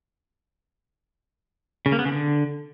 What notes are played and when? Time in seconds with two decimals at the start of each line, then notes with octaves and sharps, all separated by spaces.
1.86 C#3
1.92 A#3
1.99 B3
2.05 C#3
2.12 D3